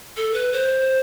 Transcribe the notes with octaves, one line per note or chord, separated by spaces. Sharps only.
A4
B4
C5